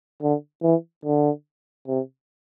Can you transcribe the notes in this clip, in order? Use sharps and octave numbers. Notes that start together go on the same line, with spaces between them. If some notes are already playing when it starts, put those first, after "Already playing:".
D3
E3
D3
C3